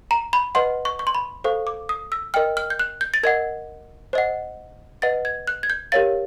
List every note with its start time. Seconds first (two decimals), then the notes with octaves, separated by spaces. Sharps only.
0.11 A#5
0.33 B5
0.55 B4 D#5 F#5 C6
0.85 C#6
0.99 C#6
1.07 C6
1.15 B5
1.44 A4 C5 F5 C#6
1.67 D6
1.89 D#6
2.12 E6
2.34 A#4 D#5 G5 F6
2.57 F6
2.70 G6
2.79 F#6
3.01 G6
3.14 A6
3.23 A#4 D#5 F#5 G#6
4.13 C5 D#5 F#5
5.02 B4 D#5 F#5 A6
5.25 G#6
5.47 F#6
5.63 G#6
5.70 G6
5.92 G4 A#4 C#5 F5 A6